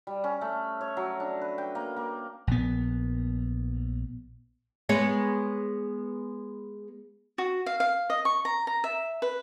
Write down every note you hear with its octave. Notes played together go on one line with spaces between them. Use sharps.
G3
C#4
A3
C#5
F#3
D4
B4
G5
A#3
A#3
A#1 B3
G#3 B3 C#5
F#4
F5
F5
D#5
C#6
A#5
A#5
E5
B4